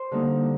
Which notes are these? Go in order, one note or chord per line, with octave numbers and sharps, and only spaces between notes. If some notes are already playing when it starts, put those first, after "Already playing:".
Already playing: C5
D3 G3 A#3 D#4